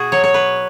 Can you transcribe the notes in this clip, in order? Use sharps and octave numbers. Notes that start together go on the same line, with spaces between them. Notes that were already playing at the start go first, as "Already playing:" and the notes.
Already playing: B2 F#4 G#4
F#3 C#5
C#5
B4